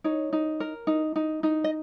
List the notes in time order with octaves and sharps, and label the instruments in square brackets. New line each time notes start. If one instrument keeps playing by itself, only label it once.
[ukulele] D#4 C#5
D#4
A#4
D#4
D#4
D#4
D#5